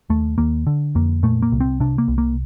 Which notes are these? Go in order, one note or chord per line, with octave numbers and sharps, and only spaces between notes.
D#2 A3
D#2 A#3
D3
F2 A#3
A#2 A3
A#3
C2
C4
C3 D4
A#3
C2
A#3